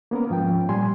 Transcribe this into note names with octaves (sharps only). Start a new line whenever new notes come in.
A#3 B3 C#4 A#4
G#2 F3 C#4 G5
A#2 G3 G#5 C6